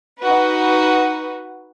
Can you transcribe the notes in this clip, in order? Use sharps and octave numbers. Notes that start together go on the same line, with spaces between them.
D#4 F#4 B4